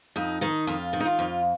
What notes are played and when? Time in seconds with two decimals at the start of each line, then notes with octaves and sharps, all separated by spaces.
0.16 F2 D#4
0.41 D#3 D#4
0.67 F2 F4
0.93 D#3
1.00 D#4
1.05 F4
1.19 F2